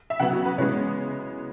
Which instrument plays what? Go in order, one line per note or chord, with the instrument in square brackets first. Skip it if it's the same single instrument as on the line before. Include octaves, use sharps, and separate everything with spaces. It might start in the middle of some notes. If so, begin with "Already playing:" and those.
[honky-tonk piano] E5
C#3 F#3 B3 F#5
F#4
B4
C#3 E3 G#3 B3 C#5